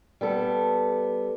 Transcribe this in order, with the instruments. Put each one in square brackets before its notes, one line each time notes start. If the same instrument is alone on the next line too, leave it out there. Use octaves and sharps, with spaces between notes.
[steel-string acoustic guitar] G3 B3 A4